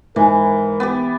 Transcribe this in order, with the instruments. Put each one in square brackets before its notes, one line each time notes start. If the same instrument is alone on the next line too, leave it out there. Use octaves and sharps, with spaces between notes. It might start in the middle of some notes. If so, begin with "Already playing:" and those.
[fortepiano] G#2 [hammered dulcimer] E3 [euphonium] A#4
[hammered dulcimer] B3 G4